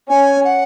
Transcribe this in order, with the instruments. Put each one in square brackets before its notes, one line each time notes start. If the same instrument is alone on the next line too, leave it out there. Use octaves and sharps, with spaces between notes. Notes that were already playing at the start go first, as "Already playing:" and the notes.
[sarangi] C#4 [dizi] G#5
[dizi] F#5